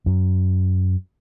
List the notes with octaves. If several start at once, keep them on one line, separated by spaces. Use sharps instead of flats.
F#2